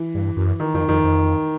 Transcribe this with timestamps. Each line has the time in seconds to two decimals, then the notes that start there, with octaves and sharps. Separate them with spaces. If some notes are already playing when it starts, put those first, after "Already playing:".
Already playing: E3
0.15 G2
0.37 F#2
0.60 D#3
0.74 F2 D#3
0.89 F2 D#3
1.04 F2